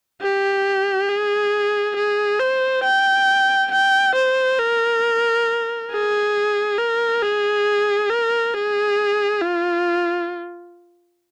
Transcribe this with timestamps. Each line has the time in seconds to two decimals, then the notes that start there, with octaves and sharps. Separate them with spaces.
0.21 G4
1.09 G#4
1.96 G#4
2.39 C5
2.84 G5
3.71 G5
4.16 C5
4.59 A#4
5.91 G#4
6.78 A#4
7.22 G#4
8.10 A#4
8.54 G#4
9.42 F4